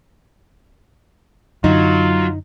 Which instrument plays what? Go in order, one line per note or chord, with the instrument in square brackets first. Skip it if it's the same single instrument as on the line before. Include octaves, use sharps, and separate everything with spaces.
[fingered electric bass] F#2 D3 [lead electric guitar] F#3 [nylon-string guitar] D#4 [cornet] F4